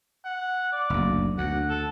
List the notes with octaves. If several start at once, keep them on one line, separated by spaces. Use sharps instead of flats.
F#5
D5
F#1 D2
D2 F#5
A4